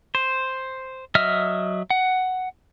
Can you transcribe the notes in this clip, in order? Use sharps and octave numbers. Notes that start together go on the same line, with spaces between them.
C5
F#3 D#5 E5 F6
F#5